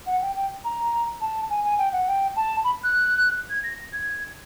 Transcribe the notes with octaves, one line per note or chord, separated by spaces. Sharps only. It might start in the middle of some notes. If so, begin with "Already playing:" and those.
F#5
G5
G5
A#5
A5
G#5
G#5
G5
F#5
G5
A5
B5
F#6
G#6
A#6
G#6